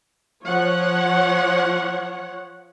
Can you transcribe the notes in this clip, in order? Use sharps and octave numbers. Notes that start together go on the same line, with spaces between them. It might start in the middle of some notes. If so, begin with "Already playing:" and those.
F3 C#5 F#5